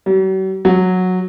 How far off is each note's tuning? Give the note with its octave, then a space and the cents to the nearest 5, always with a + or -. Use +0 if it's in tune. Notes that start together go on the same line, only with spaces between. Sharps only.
F#3 +45
F#3 -10